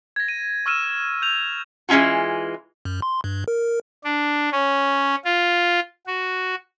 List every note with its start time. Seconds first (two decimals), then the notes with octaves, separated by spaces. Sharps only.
0.16 G#6 A#6
0.28 D#7
0.66 C#6 E6 F6 D#7 E7
1.22 G6 F7
1.89 E3 G#3 C#4 F4 F#4
2.85 F#2
3.02 C6
3.24 G2
3.48 A#4
4.04 D4
4.52 C#4
5.25 F4
6.07 F#4